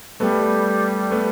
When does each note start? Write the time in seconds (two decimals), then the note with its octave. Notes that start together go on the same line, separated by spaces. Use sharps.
0.20 G3 A3 B3
1.11 A3 B3